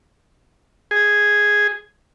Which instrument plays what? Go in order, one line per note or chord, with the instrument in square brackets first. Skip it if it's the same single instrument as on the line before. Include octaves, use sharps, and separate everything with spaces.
[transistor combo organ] G#4